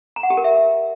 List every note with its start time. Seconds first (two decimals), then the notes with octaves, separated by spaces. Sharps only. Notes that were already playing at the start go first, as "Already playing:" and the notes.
0.16 A#5
0.23 F#5
0.30 G4
0.37 A#4
0.44 E5